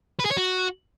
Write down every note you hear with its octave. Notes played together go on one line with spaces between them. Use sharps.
B4
G#4
C#5
F#4